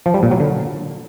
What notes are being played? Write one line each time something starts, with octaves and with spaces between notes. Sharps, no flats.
F3
G3
A#2
F#3
D3